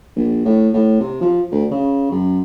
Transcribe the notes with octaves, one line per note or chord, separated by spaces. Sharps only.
A#1
A2
A2
C3
F3
D2
C#3
F#2